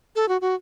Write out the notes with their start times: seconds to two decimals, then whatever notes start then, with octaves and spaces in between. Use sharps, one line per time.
0.16 A4
0.28 F#4
0.41 F#4